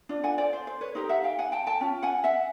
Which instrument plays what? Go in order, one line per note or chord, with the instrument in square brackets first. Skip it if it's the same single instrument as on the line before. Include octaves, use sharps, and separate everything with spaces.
[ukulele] D4 F4
F#5 G#5
C5 D5
C5
C5
B4 C#5
D#4 G4 A#4 C5
E5 F#5
F5 G5
F#5 G#5
G5 A5
G5 A5
C#4 F4
F#5 G#5
E5 F#5